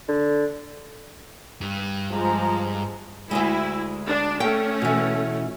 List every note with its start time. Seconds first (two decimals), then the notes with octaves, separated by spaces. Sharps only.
0.08 D3
1.61 G2
2.12 F3 G#3 A#5
3.31 D2 G#2 G#3 E4
4.07 D4
4.40 A3 C#4 G5
4.82 B2 E3